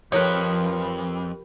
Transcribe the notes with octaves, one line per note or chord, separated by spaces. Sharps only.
F2 F3 G4 A#4 B4 C#5